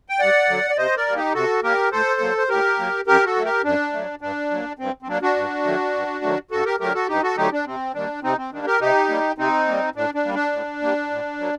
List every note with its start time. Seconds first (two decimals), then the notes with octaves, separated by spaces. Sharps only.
0.09 G5
0.19 G2 D5 F#5
0.48 D3 F#3
0.70 D5
0.77 C3 C5 D#5
0.97 A#4 D5
1.07 G3 A#3
1.16 D#4 G4
1.34 C3 F#4 A4
1.63 G3 A#3 G4 A#4
1.92 A2 A4 C5
2.20 F#3 A#3
2.38 C5
2.49 A2 G4 A#4
2.79 F#3 A#3
3.07 F#2 G4 A#4
3.25 F#4 A4
3.36 F#3 A3
3.45 G4 A#4
3.64 F#2 D4
3.93 F#3 A3
4.21 G2 D4
4.51 F#3 A#3
4.79 G2 C4
5.02 C4
5.08 F#3 A#3 D4
5.22 D4 F#4
5.36 G2
5.65 D#3 F#3 A3
5.94 G2
6.22 D#3 F#3 A3
6.51 G2 F#4 A4
6.65 G4 A#4
6.80 D3 F#3 A3 G4 A#4
6.94 F#4 A4
7.08 G2 D#4 G4
7.23 F#4 A4
7.37 D3 F#3 A3 D#4 G4
7.52 D4
7.66 C3 C4
7.94 D#3 G3 A#3 D4
8.23 C3 C4 D#4
8.37 C4
8.52 D#3 G3 A#3 D4
8.66 G4 A#4
8.80 C3 D#4 G4
9.09 G3 A#3
9.38 C3 C4 D#4
9.67 G3 A#3
9.95 A2 D4
10.14 D4
10.25 G3 A#3
10.34 D4
10.52 A2
10.82 G3 A#3
11.10 A2
11.40 F#3 A#3